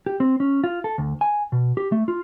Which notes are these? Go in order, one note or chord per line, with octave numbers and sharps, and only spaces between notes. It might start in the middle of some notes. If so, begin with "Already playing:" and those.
G4
C4
C#4
F4
A4
D2
G#5
B2
G4
A3
F4